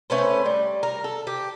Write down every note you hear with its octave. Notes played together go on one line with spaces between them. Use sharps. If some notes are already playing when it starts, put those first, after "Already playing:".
A3 C#4 B4 C5
G3
A#4
A4
G4